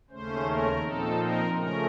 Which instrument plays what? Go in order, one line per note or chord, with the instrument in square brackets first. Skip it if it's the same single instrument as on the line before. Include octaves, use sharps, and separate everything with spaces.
[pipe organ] D#2 C#3 A3 C#4 C5
A#4
A#2 F3 C4 D#4 A4
A#4
C#3 F3 A3 C#4 A#4